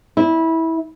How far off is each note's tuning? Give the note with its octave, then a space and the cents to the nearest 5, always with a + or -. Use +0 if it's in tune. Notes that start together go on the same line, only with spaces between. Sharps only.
E4 -20